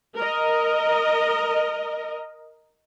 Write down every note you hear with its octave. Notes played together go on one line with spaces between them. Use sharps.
A#4 D#5